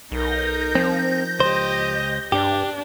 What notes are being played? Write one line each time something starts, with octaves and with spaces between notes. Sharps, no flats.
B1 D#4 A#4 G6 A#6
F3 C4
C#2 G4 C5 D#5
G2 D4 G4